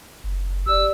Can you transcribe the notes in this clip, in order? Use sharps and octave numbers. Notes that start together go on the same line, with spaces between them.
F#1
F#1 G4 D5 E6